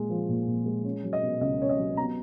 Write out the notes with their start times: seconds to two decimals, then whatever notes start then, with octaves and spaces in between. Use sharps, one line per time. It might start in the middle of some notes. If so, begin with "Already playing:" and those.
Already playing: A#2 G#3
0.09 F3
0.29 A#2
0.47 A#2
0.66 G#3
0.84 C#4
1.03 F#3
1.13 D#5
1.22 B2
1.41 C#2 D#5
1.60 C#4 C#5
1.69 D#5
1.78 F#3
1.97 B3 A#5